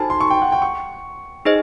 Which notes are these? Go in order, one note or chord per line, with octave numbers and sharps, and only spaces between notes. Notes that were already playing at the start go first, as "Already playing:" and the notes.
Already playing: D#4 F#4 A4 C5 G#5 A5
C6
C#6
G5
F#5
G5
C#6
D#4 G#4 C5 D#5